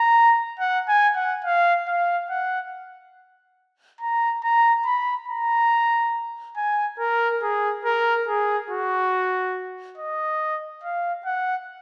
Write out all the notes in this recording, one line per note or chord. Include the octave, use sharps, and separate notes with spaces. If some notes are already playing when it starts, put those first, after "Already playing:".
Already playing: A#5
F#5
G#5
F#5
F5
F5
F#5
A#5
A#5
B5
A#5
G#5
A#4
G#4
A#4
G#4
F#4
D#5
F5
F#5